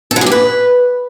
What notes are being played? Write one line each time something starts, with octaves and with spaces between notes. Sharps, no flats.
A4
F#3
G#4
G4
B4